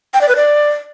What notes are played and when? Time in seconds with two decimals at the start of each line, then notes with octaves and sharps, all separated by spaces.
0.14 G5
0.21 D5
0.29 B4
0.36 D5